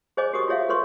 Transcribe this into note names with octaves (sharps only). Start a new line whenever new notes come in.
G#4 C5 C#5 D#5 G#5 D6
F#4 G4 A#4 C#6 D#6
F4 G#4 C#5 E5 F5
F4 A4 B4 C#5 C6 C#6